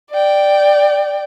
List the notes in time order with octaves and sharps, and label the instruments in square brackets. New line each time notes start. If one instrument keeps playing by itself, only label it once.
[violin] D5 G5